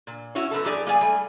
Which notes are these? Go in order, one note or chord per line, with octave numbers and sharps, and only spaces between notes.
A#2
C#4 E4 F#4 C#5
F#2 B3 A4
G2 F#3 G4 G#4 D5
A#3 G#4 D5 G#5
G3 A3 G#5